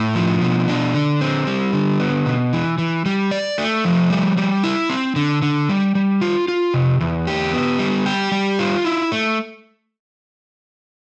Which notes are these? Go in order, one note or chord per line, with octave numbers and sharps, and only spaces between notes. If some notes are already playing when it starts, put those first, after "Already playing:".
Already playing: A2
F3
B2
D4
D3
C4
G3
D3
B3
B2
E3
E3
G3
D5
A3
F3
G3
G3
E4
C4
D3
D3
G3
G3
F4
F4
C3
E2
G4
B3
G3
G4
G3
F4
E4
A3